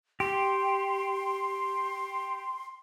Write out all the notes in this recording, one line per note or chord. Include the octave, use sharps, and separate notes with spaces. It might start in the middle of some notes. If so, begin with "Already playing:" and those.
G4 C6